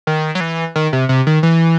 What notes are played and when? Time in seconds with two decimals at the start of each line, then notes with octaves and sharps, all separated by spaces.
0.07 D#3
0.35 F#3
0.40 E3
0.76 D#3
0.93 C3
1.09 C3
1.27 D#3
1.43 E3